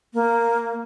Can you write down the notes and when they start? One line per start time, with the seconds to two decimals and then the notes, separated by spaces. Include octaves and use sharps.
0.14 A#3